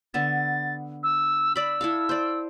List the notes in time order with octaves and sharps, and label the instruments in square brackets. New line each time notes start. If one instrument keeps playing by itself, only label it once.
[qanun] D3 B3 E5 [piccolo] A6
[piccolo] E6
[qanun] D5 B5 [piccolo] E6
[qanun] E4 A4 F5
C5 D5